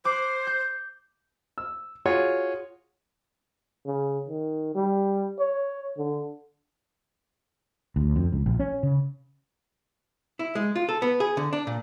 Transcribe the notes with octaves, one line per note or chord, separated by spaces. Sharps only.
C5 D6 F#6
G6
E6
F4 F#4 G#4 C#5
C#3
D#3
G3
C#5
D3
D2
F2
C#2
A#1
C#4
C#3
E4
G#3
F4
A4
B3
G#4
D3
D4
A#2